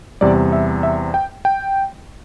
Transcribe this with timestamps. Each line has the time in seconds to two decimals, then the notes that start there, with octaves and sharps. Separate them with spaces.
0.21 E2 C3 G3 D5
0.52 E5
0.83 E5
1.14 G5
1.45 G5